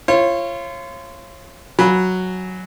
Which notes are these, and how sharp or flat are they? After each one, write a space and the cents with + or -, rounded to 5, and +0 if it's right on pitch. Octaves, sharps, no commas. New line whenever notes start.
F4 -30 C#5 -30
F#3 +0 G#5 +5 B5 -10